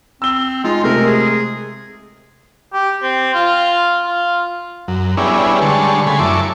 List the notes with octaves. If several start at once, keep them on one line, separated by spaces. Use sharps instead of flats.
C4 E6 G7
G#3 D#4 F4
C3 G#3 A3 A#4
G#4
G4
C4
F4
F4
F#2
G3 B3 C#4 D4 E4 G#4
D3 G3 G#3 A5 C#6
C#3 A3 G#5 B5 C6
F#2 E4 A5 C#6 D6